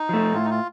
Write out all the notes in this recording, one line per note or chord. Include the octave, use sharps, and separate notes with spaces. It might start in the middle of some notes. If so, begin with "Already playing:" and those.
Already playing: D#4
F3 A3
A2 F4
D#4
F4